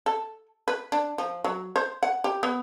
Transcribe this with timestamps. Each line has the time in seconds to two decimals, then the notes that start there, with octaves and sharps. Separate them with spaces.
0.06 A4
0.68 B4
0.92 D4
1.18 F3
1.44 F#3
1.76 C5
2.03 F#5
2.24 G4
2.43 B3